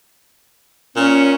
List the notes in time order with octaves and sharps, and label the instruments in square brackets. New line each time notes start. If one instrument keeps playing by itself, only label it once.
[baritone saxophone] A#2 [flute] C#4